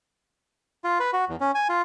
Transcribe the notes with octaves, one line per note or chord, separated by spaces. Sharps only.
F4
B4
F#4
E2
C#4
G#5
F4